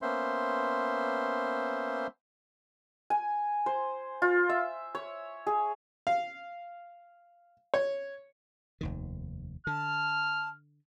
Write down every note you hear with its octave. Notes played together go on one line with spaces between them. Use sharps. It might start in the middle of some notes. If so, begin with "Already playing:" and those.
A#3 B3 C#4 C5 E5 C6
G#5
C5
F4
E5
C#5
G#4
F5
C#5
F1 D#2 D#3
D3 A5 F6